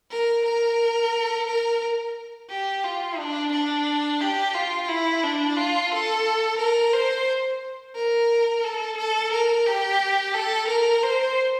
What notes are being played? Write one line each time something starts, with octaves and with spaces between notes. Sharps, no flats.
A#4
A#4
A#4
G4
F4
D4
D4
G4
F4
E4
D4
F4
A4
A#4
C5
A#4
A4
A4
A#4
G4
A4
A#4
C5